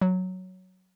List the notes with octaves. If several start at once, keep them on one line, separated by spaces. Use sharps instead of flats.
F#3